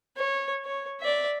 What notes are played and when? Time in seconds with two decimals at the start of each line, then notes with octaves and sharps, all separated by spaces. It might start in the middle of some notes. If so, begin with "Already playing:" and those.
0.17 C#5
0.65 C#5
1.00 D5 E5